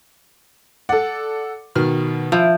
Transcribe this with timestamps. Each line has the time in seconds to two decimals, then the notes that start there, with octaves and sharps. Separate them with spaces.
0.89 A4 D5 F#5
1.76 B2 D#3 F6
2.32 F3 E4